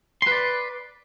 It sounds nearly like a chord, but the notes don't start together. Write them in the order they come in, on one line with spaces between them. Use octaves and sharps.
C6 B4 D5